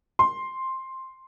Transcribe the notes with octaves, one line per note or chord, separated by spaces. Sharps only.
C6